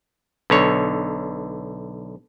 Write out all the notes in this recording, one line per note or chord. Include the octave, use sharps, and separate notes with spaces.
B1 D3 C#5